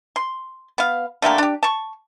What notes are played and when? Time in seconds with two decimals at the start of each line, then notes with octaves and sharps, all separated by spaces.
0.16 C6
0.78 B3 F5
1.22 D3 A3 A#3 G4
1.38 D4 G4
1.63 A5 C#6